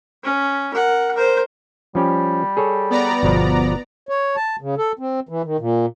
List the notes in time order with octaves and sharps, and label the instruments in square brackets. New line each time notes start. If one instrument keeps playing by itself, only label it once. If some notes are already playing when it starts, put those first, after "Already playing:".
[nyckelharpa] C#4
A#4 F#5
A#4 C5
[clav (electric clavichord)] F3 C#4 G4 [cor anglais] G3
[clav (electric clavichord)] G#4 A4 C#5
[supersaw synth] B3 D5 A#5
[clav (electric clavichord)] G1 B2 F3
[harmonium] C#5
A5
C#3
A4
C4
E3
D#3
A#2